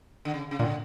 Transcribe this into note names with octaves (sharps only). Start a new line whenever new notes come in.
D3
C#3
C#3
A#2 D3